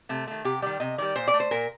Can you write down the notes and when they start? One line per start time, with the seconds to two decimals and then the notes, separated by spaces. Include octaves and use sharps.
0.09 C3 A3
0.27 D#3 A3
0.44 C3 G4
0.62 D#3 G3 D5
0.80 C3 D#5
0.98 D#3 G3 D5
1.16 A#2 C5
1.28 D5
1.34 A3
1.40 C5
1.51 A#2 A#4